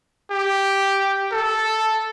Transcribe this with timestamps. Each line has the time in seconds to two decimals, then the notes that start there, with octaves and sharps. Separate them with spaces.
0.31 G4
1.32 A4